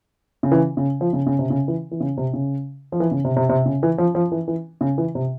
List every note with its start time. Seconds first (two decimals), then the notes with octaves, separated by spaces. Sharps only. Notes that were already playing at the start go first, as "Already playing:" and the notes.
0.43 C#3
0.52 E3
0.77 C#3
1.01 F3
1.13 C#3
1.26 C#3
1.39 C3
1.50 C#3
1.68 E3
1.91 E3
2.00 C#3
2.17 C3
2.33 C#3
2.92 F3
3.00 E3
3.11 C#3
3.24 C3
3.36 C3
3.49 C3
3.66 C#3
3.83 E3
3.98 F3
4.15 F3
4.32 E3
4.48 E3
4.81 C#3
4.98 E3
5.15 C3